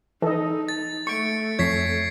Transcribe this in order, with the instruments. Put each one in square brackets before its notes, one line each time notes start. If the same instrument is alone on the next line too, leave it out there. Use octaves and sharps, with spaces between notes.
[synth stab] E3 [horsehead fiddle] D#4 [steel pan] A4 D#5
[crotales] A6
[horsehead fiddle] A3 [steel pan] C#6 [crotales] C#7 D7
[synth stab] F2 [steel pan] C#5 [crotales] G#6 B6 C7